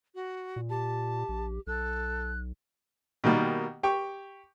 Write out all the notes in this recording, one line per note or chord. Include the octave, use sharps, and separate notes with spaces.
F#4
A#2
G4 A5
A#1
B1 A4 F#6
B2 D#3 G3 A#3
G4 G5 C#6